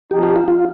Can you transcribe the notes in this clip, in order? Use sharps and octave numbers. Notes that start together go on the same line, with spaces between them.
F3 C4 D#4 G4
G4
F4
F4